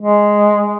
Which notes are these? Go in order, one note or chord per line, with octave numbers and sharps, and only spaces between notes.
G#3